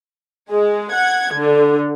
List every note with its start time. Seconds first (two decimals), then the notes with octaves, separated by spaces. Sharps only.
0.52 G#3 G#4
0.92 F#5 G#6
1.33 D3